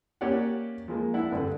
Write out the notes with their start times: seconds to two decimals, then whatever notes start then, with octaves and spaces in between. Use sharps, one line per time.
0.21 A#3 C#4 G4 C#5 D5 F#5
0.88 F3 G#3 A#3
1.14 D4 E4 F#5
1.32 G2 D3 D4